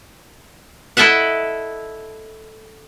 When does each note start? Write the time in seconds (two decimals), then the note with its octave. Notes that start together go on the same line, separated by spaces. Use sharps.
0.97 E4 A4 D#5 E5 F#5